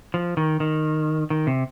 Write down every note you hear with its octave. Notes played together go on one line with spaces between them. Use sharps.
F3
D#3
D#3
D#3
C3